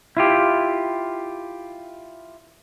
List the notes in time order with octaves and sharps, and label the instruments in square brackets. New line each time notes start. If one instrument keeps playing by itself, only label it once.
[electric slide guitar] E4 F4 G4